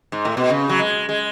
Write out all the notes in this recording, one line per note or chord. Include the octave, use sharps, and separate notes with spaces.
G#2
A2
B2
C#3
F#3
G#3
G#3